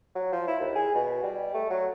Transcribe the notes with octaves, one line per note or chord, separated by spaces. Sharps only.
F#3
F3
E4
D#2
G#4
B2
G3
A3
F#3